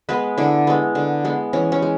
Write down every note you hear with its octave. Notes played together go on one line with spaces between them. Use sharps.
G#3 B3 B4
D3 E4
G#3 B3
D3
G#3 B3
E3 C#4
C#4
G#3